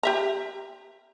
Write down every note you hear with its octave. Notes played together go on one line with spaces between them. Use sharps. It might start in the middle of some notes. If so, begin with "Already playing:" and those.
G4 E5 A#5